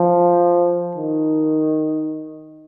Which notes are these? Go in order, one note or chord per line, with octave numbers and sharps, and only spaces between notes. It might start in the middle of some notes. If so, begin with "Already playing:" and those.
Already playing: F3
D#3